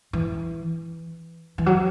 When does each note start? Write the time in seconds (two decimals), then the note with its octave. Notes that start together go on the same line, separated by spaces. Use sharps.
0.13 E3
1.58 E3
1.66 F#3